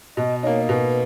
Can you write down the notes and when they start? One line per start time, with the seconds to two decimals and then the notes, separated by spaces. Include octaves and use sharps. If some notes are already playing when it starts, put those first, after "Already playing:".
0.17 B2 D#5
0.43 A#3 D#4 C#5
0.69 B2 B4